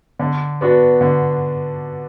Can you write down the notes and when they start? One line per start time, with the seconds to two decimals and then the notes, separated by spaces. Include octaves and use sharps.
0.19 D3
0.61 B3 D4 F#4
1.01 D3